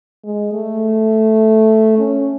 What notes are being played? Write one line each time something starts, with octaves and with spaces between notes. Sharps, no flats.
G#3
A3
C#4